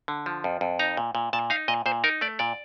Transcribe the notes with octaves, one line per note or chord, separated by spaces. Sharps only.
D3
F3
F2
F2
D#4 A#5
A#2
A#2
A#2 A5
D#4 F5
A#2 D#5
A#2 C5
D#4 A#4
A3 D5
A#2 D5